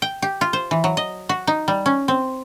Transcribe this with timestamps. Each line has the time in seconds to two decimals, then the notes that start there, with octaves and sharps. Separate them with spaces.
0.02 G5
0.22 G4
0.41 F4
0.53 C5
0.71 E3
0.84 F#3
0.97 D#5
1.29 F#4
1.47 D#4
1.68 G3
1.86 C#4
2.08 C4